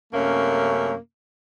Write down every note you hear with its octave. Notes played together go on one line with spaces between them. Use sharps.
F#2 C3 A3 A#3 C#4